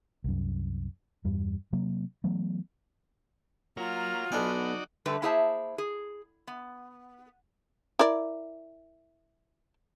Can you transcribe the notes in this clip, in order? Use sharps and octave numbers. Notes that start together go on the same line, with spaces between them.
C2 F#2
E2 G2 G3
C3 F#3 A#3
E3 F#3 A3 B3
A#3 F4 F#4 C#5 F6
B1 B3 D4 D#4 F#4 D5 G#5
G2 D3 G3 A3 B4
A#3 E4 G#4 C5 E5 A5
G#4
B3
E4 A#4 D5